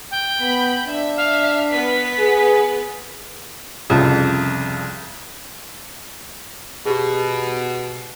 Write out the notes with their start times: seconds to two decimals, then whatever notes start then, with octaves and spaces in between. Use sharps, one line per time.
0.11 G5
0.41 B3 B5
0.87 D4 E5
1.17 F5
1.72 B3 B4 B6
2.19 G#4
3.90 C2 F2 C#3 F3
6.85 B2 G4 G#4